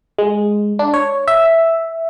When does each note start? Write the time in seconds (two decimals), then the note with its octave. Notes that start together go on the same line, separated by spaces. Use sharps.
0.18 G#3
0.79 D4
0.94 C#5
1.28 E5